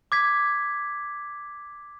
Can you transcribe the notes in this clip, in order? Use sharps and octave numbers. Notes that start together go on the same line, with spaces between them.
D6 G#6 B6